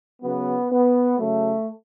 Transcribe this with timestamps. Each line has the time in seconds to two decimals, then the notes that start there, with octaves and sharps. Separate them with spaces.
0.22 C#3 F#3 B3
0.71 B3
1.18 C#3 F#3 A3